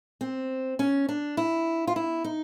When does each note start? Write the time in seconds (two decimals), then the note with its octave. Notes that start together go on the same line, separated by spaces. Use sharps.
0.21 C4
0.79 C#4
1.09 D4
1.37 E4
1.87 F4
1.96 E4
2.24 D#4